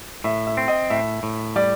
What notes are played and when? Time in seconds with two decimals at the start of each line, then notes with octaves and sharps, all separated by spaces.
0.24 A2 E5
0.47 E5
0.57 C4
0.68 D#5
0.90 A2 E5
1.23 A2
1.56 G3 D5